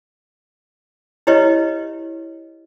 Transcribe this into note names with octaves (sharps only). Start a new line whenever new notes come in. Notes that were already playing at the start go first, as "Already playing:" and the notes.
E4 G4 B4 C#5 D#5 E5